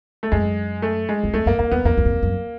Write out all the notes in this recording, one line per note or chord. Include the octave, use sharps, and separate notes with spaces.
A3
F#2 G#3
A3
G#3
E2
F2 A3
F#2 A#3
E2 A#3
E2 B3
F2 A#3
E2
F#2
F2
F#2